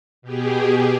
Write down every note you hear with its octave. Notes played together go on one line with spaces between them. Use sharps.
B2 G4 G#4